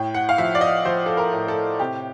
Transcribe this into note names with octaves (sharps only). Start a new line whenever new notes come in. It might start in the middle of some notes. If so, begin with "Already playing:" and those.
Already playing: A2 G5
F#5
F5
F3 E5
D5
D#5
F3 C5
A4
A#4
A2
A4
C3 G4